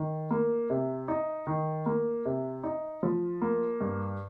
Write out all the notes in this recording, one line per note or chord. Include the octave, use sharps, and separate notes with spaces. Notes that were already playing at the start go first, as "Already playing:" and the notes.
Already playing: D#3
A#3
C3
D#4
D#3
A#3
C3
D#4
F3
A#3
G2